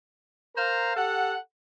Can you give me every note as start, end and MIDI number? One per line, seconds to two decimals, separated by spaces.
0.56 0.95 70
0.56 0.95 72
0.56 0.95 77
0.56 0.95 82
0.95 1.35 67
0.95 1.35 69
0.95 1.35 78